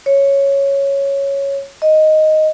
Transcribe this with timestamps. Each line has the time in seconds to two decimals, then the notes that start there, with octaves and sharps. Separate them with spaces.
0.06 C#5
1.82 D#5